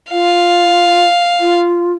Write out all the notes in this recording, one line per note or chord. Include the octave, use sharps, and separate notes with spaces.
F4 F5
F4